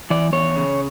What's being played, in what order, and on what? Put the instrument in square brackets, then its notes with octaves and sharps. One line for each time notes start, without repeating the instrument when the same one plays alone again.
[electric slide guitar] E3 D5
E2 C#5
C#3